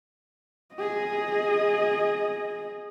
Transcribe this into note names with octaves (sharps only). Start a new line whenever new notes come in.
G#4 D#5